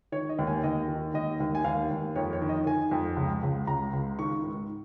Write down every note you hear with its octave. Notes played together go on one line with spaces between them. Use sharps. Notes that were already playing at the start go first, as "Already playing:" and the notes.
D#3 C#5
D#5
D#2
G#5
D#2 D#5
D#3
D#2 D#5
D#2
G#5
D#2 F5
D#2
F2 C#5
C#5
D#3
D#5
D#3 G#5
F2
C#2
C#2
C#2 A#5
C#2
D#3 C#6
G#2